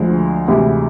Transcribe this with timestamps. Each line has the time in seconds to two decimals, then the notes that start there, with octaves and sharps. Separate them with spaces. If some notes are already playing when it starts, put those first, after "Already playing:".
Already playing: D2 D3 F3 G#3
0.48 D2 C3 E3 G#3 G4